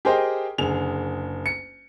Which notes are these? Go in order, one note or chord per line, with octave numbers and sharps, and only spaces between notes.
G4 G#4 A#4 C5 D#5 G5
F#1 D3 G#4 F7
C#7